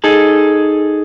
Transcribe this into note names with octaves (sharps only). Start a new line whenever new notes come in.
D#4 G#4 A4